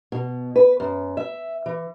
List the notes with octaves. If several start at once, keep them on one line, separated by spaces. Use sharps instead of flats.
B2
B4
F#2
E5
E3